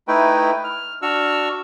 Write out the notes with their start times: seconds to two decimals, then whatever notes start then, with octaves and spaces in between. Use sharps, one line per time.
0.08 A3 D#4 E4 B4 G5
0.64 F6
1.02 D4 F#4 C#6 E6 F6